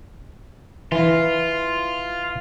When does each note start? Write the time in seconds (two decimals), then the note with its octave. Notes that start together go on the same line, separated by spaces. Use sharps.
0.92 E3 F4